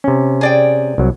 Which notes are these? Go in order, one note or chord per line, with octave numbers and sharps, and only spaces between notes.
C3 C#4
G#4 D5 G5
C2 F#3